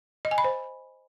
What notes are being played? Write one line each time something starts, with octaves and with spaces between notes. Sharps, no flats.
D#5
G#5
B5
C5